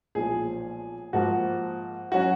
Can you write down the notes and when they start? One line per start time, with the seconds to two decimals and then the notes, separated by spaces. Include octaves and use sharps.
0.15 B1 A#2 F3 G#3 G#4
1.13 G#2 F3 A#3 F#4
2.12 F#3 C#4 F#4